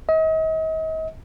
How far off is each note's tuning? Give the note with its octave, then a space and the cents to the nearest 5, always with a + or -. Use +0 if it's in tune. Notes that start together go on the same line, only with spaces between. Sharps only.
D#5 +40